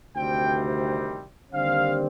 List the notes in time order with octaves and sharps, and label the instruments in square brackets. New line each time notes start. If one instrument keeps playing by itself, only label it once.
[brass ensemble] D2 C3 D#3 G3 C4 G5
D#2 D3 G3 C4 F5